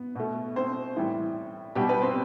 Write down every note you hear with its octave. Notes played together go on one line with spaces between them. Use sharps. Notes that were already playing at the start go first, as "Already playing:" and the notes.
Already playing: B3
B2 A3
C4 C5
A2 E3 G3
B2 G3 G4
B3 B4
C4 C5